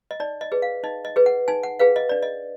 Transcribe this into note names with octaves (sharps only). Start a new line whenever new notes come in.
D#5
D#4 D5
D#5
G#4 B4
F5
D#4 D#5
D#5
G#4 B4
F#5
D#4 G#5
F#5
G#4 B4 F5
D#5
D4 D5
D#5